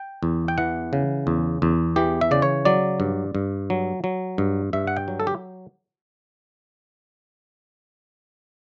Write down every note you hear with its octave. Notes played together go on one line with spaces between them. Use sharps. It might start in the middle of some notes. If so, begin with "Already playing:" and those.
Already playing: G5
E2
G5
E3 F#5
C#3
E2
E2
E3 G4
E5
C#3 D5
C#5
F#3 D5
G2
G2
F#3
F#3
G2
G2 E5
F#5
G5
F#3
A4
G4